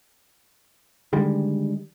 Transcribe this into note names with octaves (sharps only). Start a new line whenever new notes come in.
D3 D#3 G3 G#3